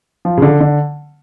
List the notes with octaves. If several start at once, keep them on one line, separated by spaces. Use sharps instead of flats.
F3
C#3
D3
D3